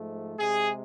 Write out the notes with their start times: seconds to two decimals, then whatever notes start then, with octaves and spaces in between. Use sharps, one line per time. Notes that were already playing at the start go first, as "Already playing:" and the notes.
Already playing: G#2 F3 A3
0.38 C3 G#3 G#4